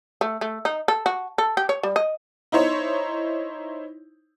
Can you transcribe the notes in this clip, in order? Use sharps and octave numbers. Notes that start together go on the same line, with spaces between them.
A3
A3
D#4
A4
F#4
A4
G4
C#5
G3
D#5
D#4 E4 C5 C#5